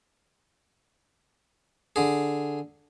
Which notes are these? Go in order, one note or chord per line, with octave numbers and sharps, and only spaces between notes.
D3 G#4